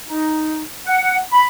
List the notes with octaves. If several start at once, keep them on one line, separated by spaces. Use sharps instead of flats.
D#4
F#5
B5